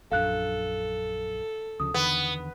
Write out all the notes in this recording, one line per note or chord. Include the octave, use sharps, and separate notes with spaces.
A#1 F#2 D4 A4 F5 F#6
D2 C#3 F3 D#6
E2 D3 D#3 B3